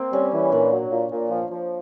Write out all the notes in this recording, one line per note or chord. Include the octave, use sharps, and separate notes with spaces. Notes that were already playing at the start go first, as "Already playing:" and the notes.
Already playing: A#3 C4
G3 C#4
E3
A#2 D4
F#3
A#2
A#2
F3
F3